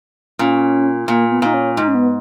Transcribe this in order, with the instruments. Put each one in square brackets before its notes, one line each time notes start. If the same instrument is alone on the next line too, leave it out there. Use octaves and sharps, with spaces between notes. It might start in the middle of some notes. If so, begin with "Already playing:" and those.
[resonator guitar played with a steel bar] A#2 [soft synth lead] C#4
[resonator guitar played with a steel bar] A#2 [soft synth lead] A#3
[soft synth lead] B3
[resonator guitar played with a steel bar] A#2 [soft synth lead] D#4
[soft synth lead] C#4
[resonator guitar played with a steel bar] G#2 [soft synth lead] D#4
[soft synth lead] C#4
B3